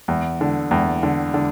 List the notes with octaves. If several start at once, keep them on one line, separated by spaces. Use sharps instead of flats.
E2
D3
E2
D3
D3